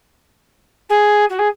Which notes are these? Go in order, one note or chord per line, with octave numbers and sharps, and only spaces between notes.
G#4
F#4
G#4